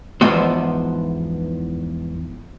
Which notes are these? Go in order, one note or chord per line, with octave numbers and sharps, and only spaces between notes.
E2 G#2 E3 F3 B3 C5